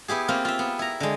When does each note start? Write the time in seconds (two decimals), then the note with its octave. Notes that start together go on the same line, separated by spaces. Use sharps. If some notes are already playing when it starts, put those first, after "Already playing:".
0.08 B3 E4 G4 G#4
0.28 A#3 C4 F4
0.45 F4 E5
0.59 B3
0.79 E4 A#5
1.00 D3 G#3